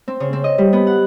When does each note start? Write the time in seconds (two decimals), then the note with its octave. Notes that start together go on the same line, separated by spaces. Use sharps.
0.08 C4
0.20 C#3
0.33 C4
0.44 D#5
0.58 G3
0.73 B3
0.87 F#5